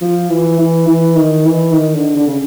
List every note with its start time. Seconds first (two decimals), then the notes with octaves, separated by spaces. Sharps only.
0.01 F3
0.30 E3
0.59 E3
0.87 E3
1.16 D#3
1.45 E3
1.73 D#3
1.95 D3
2.16 D3
2.27 C#3